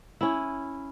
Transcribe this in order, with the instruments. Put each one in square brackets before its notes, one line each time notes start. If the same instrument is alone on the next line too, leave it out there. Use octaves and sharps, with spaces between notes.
[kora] C#4 E4